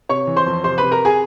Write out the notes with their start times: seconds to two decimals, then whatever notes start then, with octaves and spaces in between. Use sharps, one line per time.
0.09 C3 C#5 C#6
0.27 E3
0.36 C5 C6
0.46 F2
0.64 C3 C5 C6
0.78 C3 B4 B5
0.92 A#4 A#5
1.05 G#4 G#5